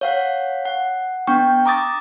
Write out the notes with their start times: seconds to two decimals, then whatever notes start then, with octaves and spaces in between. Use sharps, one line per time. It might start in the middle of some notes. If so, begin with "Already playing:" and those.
0.01 C#5 F5 F#5
0.65 F#5
1.27 B3 D4 G5 C#6
1.66 A#5 D6 D#6 A6